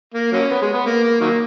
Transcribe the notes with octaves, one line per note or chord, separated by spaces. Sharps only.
A#3
F#3 A#3 C#4
B3
G#3
B3
A#3
A#3
D#3 F#3 A#3